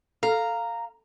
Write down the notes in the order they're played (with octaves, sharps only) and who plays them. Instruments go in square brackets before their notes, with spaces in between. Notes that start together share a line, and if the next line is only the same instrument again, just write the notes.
[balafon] A4 [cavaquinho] F5 [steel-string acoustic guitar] A#5